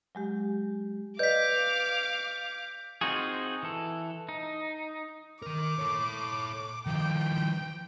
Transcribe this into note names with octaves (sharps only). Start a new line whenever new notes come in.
F#3 G#3 G4
B4 D5 D#5 F5 D6 G6 B6
C4 D#4 F4 F#4 G#4
E3 A4
D#4
D#3 A#4 D6
A4 C#5
D#3 F3 G5